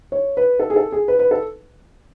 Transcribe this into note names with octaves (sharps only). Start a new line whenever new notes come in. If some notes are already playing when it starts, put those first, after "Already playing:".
C#5
B4
A4
G#4
A4
G#4
B4
B4
A4